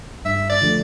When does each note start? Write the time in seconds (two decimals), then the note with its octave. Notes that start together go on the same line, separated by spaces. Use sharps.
0.25 G2 E5
0.50 D5
0.61 D3 F3 A3